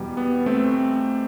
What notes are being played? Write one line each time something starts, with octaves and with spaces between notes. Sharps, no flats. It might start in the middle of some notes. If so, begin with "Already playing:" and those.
Already playing: E2 B2 G3
B3
A3 C4